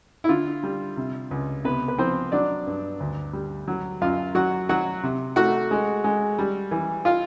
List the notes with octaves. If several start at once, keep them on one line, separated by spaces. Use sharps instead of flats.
E4
D3 F4
G3
C3
C#2
C3 B3 B4
B4
F3 C4 C5
F#3 D4 D5
G2
D2
G3
F#3
F#2 F4 F5
F#3 F#4 F#5
F#3 F#4 F#5
C3
A3 F#4 F#5
G#3
G#3
G3
E3
F4 F5